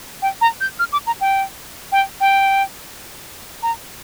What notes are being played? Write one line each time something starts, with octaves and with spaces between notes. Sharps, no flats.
G5
A#5
G6
F6
D6
A#5
G5
G5
G5
A#5